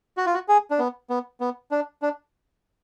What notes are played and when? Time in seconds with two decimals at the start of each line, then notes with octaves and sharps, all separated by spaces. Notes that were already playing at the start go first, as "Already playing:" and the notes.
0.17 F#4
0.26 F4
0.34 F#4
0.48 G#4
0.70 D4
0.79 B3
1.10 B3
1.40 B3
1.71 D4
2.02 D4